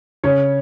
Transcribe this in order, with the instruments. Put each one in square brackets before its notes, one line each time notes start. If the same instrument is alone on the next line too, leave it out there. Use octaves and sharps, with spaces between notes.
[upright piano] C#3 C#4 C#5